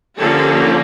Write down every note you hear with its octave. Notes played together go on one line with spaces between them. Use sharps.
D3 F3 A#3 C#4 G4 A4